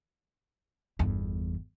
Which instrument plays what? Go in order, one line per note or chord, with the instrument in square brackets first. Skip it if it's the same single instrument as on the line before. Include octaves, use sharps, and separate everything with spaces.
[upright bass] G1 E2